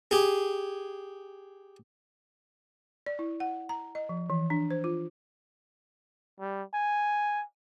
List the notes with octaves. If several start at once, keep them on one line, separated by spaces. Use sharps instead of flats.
G4 G#4
D5
E4
F#5
A#5
D#5
F3
E3
D4
C5
F4
G3
G#5